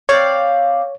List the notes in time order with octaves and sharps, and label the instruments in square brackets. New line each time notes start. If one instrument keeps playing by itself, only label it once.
[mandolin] C4 D5 F5 [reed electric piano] C#5